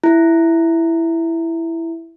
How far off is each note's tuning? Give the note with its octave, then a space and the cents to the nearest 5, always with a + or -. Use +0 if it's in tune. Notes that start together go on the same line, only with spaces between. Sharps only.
E4 +5